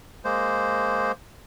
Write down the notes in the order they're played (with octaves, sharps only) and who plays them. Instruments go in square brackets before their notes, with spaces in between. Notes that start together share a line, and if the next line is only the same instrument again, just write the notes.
[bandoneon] G#3 A#3 C5